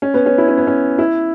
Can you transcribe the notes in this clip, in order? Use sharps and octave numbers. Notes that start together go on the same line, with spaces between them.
C#4
B3
C#4
E4
C#4
B3
C#4
E4